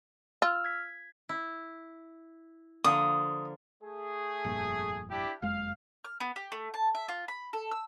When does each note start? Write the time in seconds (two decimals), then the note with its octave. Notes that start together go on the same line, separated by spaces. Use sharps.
0.42 F4 E6 F6
0.64 G#6 B6
1.29 E4
2.84 D3 F3 A#3 D#6
3.83 A3 G#4
4.44 F1 G2 A#2
5.11 D4 E4 G4
5.42 F#1 F2 G#3 F5
6.05 F6
6.20 B3
6.36 G4
6.52 A3
6.74 A5
6.95 E5
7.08 F4
7.28 B5
7.53 A4
7.71 E6